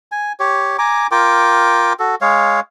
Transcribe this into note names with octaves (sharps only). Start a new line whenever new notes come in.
G#5
G4 C#5
G#5 A#5 D6
F4 A#4 G5 D6
F#4 A4
G#3 C#5 F5